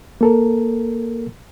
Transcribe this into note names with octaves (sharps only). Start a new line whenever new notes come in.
A#3 A4 A#4